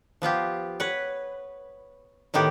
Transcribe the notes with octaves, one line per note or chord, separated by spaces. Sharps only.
F3 B3 F4 G4
B4 C#5 F#5
A2 D#3 B3 G4 F#5